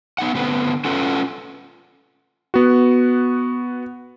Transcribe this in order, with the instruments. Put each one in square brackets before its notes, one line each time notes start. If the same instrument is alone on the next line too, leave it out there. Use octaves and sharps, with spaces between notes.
[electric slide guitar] B3 D#4 F#5
D3 B3 C4 B4
C#4 F4 A4 B4 F#5
[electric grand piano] B3 F#4